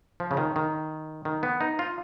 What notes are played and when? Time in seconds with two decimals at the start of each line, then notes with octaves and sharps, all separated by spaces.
0.20 F3
0.31 C#3
0.37 D#3
0.56 D#3
1.25 D#3
1.43 B3
1.61 D#4
1.79 F4